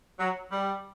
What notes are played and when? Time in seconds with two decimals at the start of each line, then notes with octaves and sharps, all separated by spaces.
0.19 F#3
0.51 G3